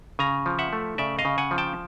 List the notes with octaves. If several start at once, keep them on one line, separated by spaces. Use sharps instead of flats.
C#3 G#5 A#5
F3
E5 F#5
A3
C#3 D5 E5
D#5 F5
C#3
F#5 G#5
F3
G5 A5